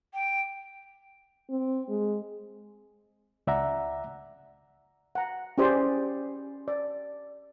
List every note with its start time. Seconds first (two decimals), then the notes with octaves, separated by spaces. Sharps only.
0.13 G5
1.50 C4
1.89 G#3
3.47 C#2 D5 E5 F#5 A#5
5.15 F#5 A#5
5.58 C#4 E4 G4 G#4 C5 D5
6.68 D5